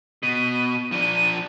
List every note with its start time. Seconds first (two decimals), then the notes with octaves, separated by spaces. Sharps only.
0.23 B2 D#7
0.92 F3 D4 D#7